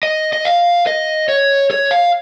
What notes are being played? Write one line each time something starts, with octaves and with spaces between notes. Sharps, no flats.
D#5
D#5
F5
D#5
C#5
C#5
F5